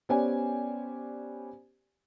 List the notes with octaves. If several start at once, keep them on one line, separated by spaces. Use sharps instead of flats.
B3 C#4 G4 C5 D5 G#5